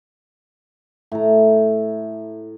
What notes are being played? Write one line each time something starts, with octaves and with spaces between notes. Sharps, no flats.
A2 A#5